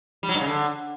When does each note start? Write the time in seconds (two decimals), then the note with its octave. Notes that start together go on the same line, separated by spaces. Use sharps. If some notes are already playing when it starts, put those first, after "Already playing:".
0.23 G3
0.29 F#3
0.35 G2
0.40 C#3
0.46 D3